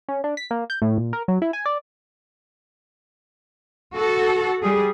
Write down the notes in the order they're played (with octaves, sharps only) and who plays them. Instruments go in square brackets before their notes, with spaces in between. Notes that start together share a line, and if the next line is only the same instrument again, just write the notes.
[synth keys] C#4
D4
B6
A#3
G6
A2
A#2
A#4
F#3
E4
G#5
D5
[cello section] F#4 A4
G3 G#4